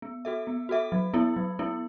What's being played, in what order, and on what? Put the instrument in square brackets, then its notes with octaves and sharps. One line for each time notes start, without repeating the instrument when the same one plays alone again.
[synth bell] B3
F#4 A4 E5
B3
F#4 A4 E5
F#3
B3 E4
F#3
B3 E4